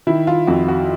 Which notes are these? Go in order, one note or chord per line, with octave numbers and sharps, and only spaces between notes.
D#3 E4
F4
F2 F#4
F#4